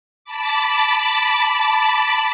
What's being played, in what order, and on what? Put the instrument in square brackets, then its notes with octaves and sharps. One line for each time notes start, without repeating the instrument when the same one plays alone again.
[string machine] A5 B5 D6